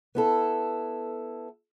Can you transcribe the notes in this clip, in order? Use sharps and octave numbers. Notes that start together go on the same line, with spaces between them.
B3 E4 A4